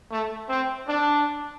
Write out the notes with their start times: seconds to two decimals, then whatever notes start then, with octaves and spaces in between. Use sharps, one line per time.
0.11 A3
0.49 C4
0.88 D4